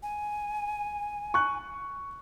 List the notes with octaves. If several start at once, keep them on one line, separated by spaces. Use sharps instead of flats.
G#5
C#6 F#6